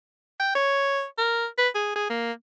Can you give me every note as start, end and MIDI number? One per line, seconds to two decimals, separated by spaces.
0.40 0.53 79
0.55 1.04 73
1.18 1.46 70
1.58 1.69 71
1.75 1.95 68
1.96 2.06 68
2.10 2.32 58